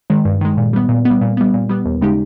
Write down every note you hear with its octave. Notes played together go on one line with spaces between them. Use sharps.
D#3 G#3
G2
D#3 G#3
A#2
G3 B3
A#2
G3 B3
A#2
G3 B3
A#2
G3 B3
D#2
C#3 G#3 D#4 G4